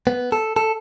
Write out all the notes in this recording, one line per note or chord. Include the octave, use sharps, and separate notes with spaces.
B3
A4
A4